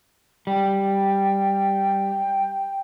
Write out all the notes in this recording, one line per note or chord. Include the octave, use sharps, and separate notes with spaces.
G3 G5